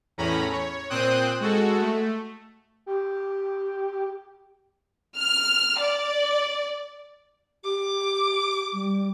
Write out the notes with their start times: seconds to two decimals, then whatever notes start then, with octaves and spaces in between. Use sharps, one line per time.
0.18 E2 A2 C#4 A#5 B5
0.52 C#5
0.90 A#2 C4 C5 G5 D#6 F#6
1.40 G#3 F#4 A4
1.81 A3
2.86 G4
5.17 F6
5.80 D5
7.64 G4 D6
8.73 G3